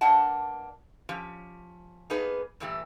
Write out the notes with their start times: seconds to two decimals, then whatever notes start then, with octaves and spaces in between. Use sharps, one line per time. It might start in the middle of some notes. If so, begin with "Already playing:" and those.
0.01 G2 A#3 D4 D#5 F#5 A5
1.09 F3 C#4 G4
2.10 A#3 B3 D#4 G#4 B4
2.60 G2 A#2 E3 A3 G4